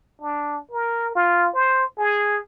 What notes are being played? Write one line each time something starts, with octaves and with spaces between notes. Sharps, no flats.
D4
A#4
F4
C5
G#4